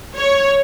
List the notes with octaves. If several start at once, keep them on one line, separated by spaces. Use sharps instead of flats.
C#5